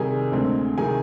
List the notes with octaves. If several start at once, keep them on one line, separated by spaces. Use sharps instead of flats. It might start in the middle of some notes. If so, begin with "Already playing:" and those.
Already playing: C3 D#3 G3 G#4 G#5
D2 D3 G#3 C4
C3 D#3 G#4 G#5